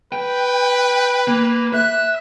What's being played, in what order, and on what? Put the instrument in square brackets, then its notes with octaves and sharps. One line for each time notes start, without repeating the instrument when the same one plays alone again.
[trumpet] B4 [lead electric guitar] G5
[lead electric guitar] A#3
[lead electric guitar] E5 [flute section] F#6